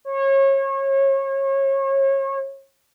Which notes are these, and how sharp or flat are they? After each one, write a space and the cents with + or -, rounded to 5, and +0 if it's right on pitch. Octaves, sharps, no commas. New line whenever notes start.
C#5 -30